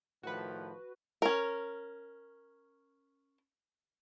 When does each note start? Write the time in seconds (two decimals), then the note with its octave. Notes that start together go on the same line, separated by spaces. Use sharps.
0.23 A2 D#3 F3 F#4 B4
1.22 C#4 A#4